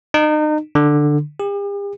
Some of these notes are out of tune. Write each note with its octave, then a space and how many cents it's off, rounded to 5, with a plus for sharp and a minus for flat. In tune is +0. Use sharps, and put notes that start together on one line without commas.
D#4 -35
D3 +10
G4 +45